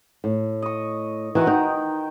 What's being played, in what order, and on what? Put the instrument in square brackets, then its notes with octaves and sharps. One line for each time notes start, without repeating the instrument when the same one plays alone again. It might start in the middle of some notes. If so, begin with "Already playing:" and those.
[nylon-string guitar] A2
[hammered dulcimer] D#5 C#6
[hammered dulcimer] D#3 F#4 F#5 [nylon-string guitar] E3
[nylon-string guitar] D#4 [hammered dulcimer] G5